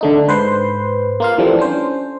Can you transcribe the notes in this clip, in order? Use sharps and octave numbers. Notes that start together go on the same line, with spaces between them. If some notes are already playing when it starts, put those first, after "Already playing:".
D3 A3 D#4
G#2 B4 C5 C6
A#3 F4 F5
E3 F3 G3 A3 C4
C#4 D4 C5